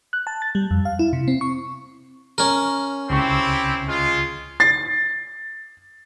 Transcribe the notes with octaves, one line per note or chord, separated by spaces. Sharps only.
F#6
A5
A6
G3
F2
F5
E4
C3
C4
C#6
C#4 A#4
C#2 C#3 C4 E4 G4 C#6
G#3 F4
A6 C7